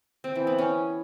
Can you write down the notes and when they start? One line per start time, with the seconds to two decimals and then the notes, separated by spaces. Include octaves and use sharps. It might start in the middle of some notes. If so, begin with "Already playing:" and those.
0.24 C4
0.35 E3
0.47 B3
0.58 C#4